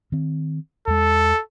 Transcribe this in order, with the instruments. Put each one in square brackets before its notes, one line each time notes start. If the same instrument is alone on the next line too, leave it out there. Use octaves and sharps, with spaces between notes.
[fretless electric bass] D#3 C4
[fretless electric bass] E2 G#3 [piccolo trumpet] A4